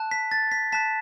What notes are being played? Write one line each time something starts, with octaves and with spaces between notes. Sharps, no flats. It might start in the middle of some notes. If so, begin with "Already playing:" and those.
Already playing: A5 F#6
B6
A6
B6
A5 F#6 B6